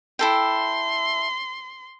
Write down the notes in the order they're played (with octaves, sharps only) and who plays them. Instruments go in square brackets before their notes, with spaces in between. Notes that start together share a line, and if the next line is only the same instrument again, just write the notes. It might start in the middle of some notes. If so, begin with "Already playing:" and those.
[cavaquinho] E4 A4 G5 [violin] C6